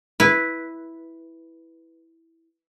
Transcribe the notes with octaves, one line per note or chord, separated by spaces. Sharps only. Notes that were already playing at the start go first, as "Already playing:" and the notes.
E4 B4